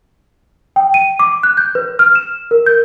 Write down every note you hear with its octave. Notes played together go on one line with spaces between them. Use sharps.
G5
D#7
D6
F#6
G6
B4
F6
E7
A#4
G6